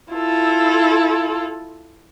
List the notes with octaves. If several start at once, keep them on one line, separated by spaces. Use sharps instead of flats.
E4 F4 A4